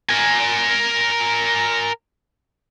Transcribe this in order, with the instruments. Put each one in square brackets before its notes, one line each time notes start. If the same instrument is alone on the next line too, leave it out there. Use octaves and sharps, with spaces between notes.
[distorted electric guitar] A#4 G#5